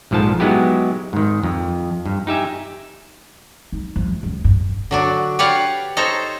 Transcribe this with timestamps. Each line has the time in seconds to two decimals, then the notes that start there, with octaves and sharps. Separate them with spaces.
0.11 A#1 G#2 F3 A4 A5
0.40 F#3 G#3 B3 D#4 E4 G4
1.13 G#2 D#3
1.43 F2
2.06 G2
2.27 D#4 G4 E5 G#5
3.72 D#4
3.96 F3
4.08 A3
4.23 C#2
4.44 G2
4.91 D3 F#3 D4
5.39 G4 B4 C#5 D5 F5 F#5
5.97 D#4 A4 C5 C#5 A#5